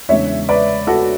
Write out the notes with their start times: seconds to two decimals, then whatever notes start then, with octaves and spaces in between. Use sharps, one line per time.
0.09 E2 C#3 G#3 D4 C#5 E5
0.49 B4 D5
0.87 F#4 A4